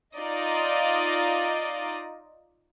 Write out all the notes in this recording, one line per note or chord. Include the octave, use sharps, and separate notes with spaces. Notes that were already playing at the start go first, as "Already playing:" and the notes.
D#4 F4 D5 D#5